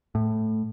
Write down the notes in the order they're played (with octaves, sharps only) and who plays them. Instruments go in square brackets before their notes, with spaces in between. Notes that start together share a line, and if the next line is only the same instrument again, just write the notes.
[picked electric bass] A2